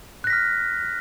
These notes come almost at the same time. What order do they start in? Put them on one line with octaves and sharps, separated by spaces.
F#6 A#6 B6 F6